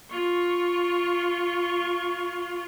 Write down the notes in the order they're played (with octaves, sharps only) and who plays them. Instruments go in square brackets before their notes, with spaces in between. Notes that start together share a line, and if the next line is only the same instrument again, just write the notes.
[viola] F4 C#6